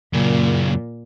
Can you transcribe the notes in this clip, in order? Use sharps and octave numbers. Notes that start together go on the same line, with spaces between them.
F#2 A#2 C#3